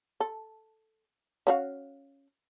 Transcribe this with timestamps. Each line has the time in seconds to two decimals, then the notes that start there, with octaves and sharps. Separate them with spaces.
0.20 A4
1.47 C#4 F#4 F5